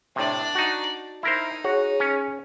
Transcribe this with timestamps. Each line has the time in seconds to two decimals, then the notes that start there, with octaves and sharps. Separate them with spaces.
0.16 A2 C3 D4 D5
0.55 D#4 F#4
1.23 D#4 E4 A#4 C5
1.64 F#4 G#4 C#5 F#5
2.00 C#4